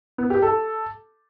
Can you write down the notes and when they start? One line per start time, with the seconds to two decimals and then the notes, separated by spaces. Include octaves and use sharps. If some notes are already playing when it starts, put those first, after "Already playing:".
0.18 B3
0.30 G4
0.42 A4